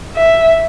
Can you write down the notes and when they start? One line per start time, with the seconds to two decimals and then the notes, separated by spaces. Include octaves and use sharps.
0.16 E5